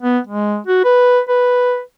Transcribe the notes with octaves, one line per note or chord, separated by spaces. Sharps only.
B3
G#3
F#4
B4
B4